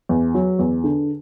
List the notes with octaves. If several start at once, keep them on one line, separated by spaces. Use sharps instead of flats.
E2
F#3
E2
D3